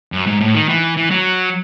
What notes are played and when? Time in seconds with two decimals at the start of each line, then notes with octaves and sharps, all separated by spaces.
0.12 F#2
0.27 G#2
0.41 A2
0.55 D#3
0.69 E3
0.97 E3
1.11 F#3